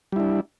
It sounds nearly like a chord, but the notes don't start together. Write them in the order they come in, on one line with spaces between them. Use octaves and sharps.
G3 E4 D4